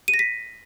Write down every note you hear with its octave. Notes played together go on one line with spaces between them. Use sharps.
D#7
A#6
B6